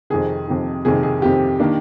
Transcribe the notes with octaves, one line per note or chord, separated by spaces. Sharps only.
F2 C3 D#3 G#4
F2 C3 D#3
F2 C3 D#3 G#4
G#4
F2 C3 D#3 G4
D#3 A#3 D4